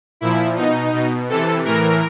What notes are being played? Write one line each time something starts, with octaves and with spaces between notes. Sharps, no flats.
A#2 F3 E4
B2 D#4
B2
C3 E3 A4
A2 E3 A#4